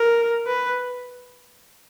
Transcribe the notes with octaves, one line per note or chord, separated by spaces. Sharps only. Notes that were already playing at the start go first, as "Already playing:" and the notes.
Already playing: A#4
B4